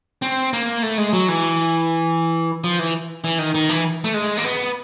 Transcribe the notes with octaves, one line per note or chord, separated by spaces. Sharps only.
C4
A#3
A3
G#3
F#3
E3
F3
E3
E3
D#3
D#3
E3
A3
G#3
A#3
B3